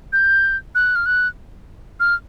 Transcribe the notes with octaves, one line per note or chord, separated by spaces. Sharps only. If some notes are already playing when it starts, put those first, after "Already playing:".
G6
F#6
F6
F#6
F6